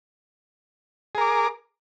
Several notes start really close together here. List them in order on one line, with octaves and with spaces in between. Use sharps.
G#4 A#4 D6